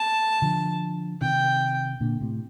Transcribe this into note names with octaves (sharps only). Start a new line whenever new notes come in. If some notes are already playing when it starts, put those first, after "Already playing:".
Already playing: A5
D3 F3
C3 D#3 G5
A#2 D3
A2 C3